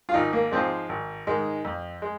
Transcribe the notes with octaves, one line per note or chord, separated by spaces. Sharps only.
F4
G#1 D#4
A#3
G#2 F3 G#3 C4
G#1
G#2 D#3 G#3
F2
G#3